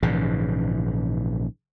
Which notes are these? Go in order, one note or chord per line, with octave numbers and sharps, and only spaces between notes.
A#1 G#2 C#3 E3